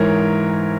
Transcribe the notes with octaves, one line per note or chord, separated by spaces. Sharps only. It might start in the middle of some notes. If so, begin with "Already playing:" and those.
Already playing: G#2 E3 A#4 C#5